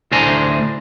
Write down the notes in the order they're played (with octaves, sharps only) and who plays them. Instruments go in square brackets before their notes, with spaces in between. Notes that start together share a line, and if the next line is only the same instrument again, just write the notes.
[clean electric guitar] D2 A2 D4 C5 G#5 A#5